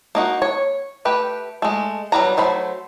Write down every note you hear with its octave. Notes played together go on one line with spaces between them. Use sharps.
A#3 D#4 F#4
C#5
A3 G4 B4
G#3 A3
F#3 G3 B4 A#5
F#3 A3 C5 B5